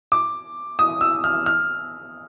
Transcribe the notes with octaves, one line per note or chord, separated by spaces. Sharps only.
D6
D#6
E6
F6
F6